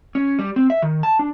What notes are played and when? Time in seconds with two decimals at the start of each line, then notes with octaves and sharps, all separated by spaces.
0.15 C#4
0.39 G3
0.56 C4
0.70 E5
0.82 D#3
1.03 A5
1.19 D4